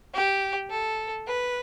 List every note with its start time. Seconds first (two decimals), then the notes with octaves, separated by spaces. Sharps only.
0.14 G4
0.70 A4
1.27 B4